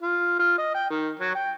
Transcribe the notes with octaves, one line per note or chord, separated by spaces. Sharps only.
F4
F4
D#5
G5
D#3
F#3
G5